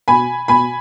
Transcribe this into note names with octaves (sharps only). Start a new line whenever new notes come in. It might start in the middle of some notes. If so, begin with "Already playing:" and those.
B2 G#5 B5
B2 G#5 B5